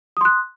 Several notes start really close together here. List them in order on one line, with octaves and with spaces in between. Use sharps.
D#6 C6 F#6